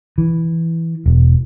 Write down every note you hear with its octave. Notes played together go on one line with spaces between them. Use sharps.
E3
E1